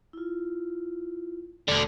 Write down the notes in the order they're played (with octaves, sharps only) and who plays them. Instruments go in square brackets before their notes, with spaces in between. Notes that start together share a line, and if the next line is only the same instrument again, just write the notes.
[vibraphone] E4 F4
[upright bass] E1 [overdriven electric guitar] D2 D3